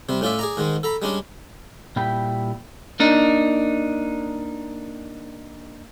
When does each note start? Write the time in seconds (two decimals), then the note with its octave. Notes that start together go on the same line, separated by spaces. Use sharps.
0.09 C3 G3 C4
0.21 A2 C#4 F4 D5 E5
0.39 G#4 D5 A#5
0.57 G#2 D#3 G#3
0.83 A4 A#5 B5
1.02 G3 G#3 C#4 D4
1.96 A#2 G3 E4 G5 B5
3.00 A#3 D4 D#4